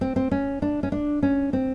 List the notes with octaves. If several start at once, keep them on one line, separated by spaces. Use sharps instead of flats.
C4
C4
C#4
D4
C#4
D4
C#4
C4